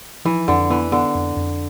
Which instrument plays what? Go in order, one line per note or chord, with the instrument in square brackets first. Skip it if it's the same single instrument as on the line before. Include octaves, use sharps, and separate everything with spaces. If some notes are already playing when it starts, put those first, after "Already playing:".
[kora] E3 [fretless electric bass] F3
[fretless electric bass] F2 [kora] D3
[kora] E3 [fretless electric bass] B3
[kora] D3 [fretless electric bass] B3
[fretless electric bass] F2
F2